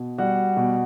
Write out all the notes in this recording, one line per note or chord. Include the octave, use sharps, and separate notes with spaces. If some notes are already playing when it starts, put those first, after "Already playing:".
Already playing: B2
G3 F#4 F#5
B2